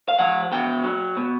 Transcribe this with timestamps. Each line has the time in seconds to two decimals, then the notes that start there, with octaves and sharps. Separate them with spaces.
0.08 F5
0.19 F3 F#5
0.52 B2 G5
0.84 F#3
1.17 B2